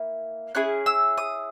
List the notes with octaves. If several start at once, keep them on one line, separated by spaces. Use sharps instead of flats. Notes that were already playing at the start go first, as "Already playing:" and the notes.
Already playing: A#3 E4
C#4 E4 G#4 F#6
E6
D#6